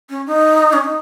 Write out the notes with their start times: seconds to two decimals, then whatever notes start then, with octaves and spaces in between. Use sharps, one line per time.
0.10 C#4
0.27 D#4
0.73 C#4
0.84 D#4